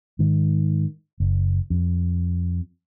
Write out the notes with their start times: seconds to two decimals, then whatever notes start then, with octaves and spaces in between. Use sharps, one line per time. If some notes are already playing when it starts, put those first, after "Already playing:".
0.19 G#2 D#3
1.20 F#1
1.70 F2